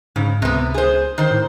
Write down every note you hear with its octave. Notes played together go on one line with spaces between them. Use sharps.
G#2 C#3
C#2 C3 B3
G#4 C5
D#3 C5
A2